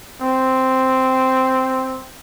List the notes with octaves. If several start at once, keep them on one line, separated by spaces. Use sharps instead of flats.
C4